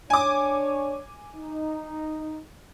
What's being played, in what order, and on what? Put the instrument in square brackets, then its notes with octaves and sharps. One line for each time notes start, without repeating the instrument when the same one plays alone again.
[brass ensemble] D4 C#5 [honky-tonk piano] G#5 D6
[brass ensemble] D#4